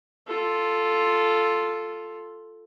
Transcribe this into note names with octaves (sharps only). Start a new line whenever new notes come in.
F4 A4